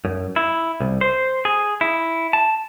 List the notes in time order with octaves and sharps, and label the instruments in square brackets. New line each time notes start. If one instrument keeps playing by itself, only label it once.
[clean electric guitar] F#2
E4
C2
C5
G#4
E4
A5